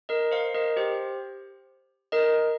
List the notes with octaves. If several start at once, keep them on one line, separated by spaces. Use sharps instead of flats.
A#4 D#5
C5 F5
A#4 D#5
G4 C5
A#4 D#5